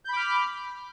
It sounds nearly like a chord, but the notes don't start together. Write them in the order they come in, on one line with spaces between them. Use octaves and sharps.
G6 B5 D6 F6